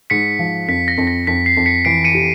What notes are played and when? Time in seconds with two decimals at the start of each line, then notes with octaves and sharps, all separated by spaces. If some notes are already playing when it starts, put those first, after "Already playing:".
0.10 G#2 B6 C#7
0.39 F3
0.68 F2 B6
0.88 A#6
0.98 F2
1.07 A#6
1.27 F2 B6
1.46 C7
1.57 F2
1.66 B6 C#7
1.85 E3 C7 D7
2.04 C#7 D#7
2.15 G4